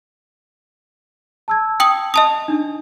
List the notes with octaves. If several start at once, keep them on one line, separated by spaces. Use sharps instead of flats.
A5 E6 G#6
G5 D#6 F#7
D#5 A5 D#6 F7
D4 D#4